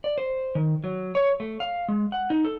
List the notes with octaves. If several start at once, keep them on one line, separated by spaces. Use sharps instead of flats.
D5
C5
D#3
F#3
C#5
A3
F5
G#3
F#5
D#4
A4